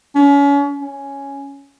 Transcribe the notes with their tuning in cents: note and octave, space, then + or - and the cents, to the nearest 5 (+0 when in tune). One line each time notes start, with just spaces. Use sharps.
C#4 +35
C#4 +0